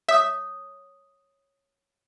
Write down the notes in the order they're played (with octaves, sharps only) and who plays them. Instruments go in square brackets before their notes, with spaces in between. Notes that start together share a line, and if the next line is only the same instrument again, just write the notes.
[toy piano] C#5 D#6 [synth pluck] E5